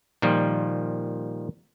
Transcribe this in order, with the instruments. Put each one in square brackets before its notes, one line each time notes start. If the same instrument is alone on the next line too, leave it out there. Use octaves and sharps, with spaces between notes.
[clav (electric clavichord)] A#2 D#3 F3 G3